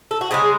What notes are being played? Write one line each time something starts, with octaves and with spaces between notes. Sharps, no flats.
A4
F#4
C#3 E3 G#3 G#4